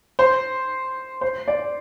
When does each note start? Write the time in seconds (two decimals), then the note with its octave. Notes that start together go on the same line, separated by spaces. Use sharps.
0.19 C5
1.21 C5
1.48 D5